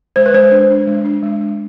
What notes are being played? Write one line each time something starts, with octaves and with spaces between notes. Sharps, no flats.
G#3 C5
B4
G#3 C5
D4
D4
G#3
D4
G#3
G#3